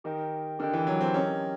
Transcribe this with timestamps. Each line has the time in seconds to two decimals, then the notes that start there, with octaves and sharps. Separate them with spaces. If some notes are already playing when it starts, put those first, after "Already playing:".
0.04 D#3 G4 A#4 D#5 G5
0.59 D3 G4 A#4 D#5 G5
0.73 E3
0.87 F#3
1.01 C4
1.14 C#4 G4 A#4 D#5 G5